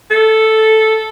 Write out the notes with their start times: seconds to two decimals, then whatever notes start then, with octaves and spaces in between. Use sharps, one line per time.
0.11 A4